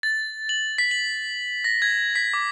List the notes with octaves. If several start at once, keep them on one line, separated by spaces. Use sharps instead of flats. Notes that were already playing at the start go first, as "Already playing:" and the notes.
A6
F#7
B6
F#7
A#6
G#6
B6
D6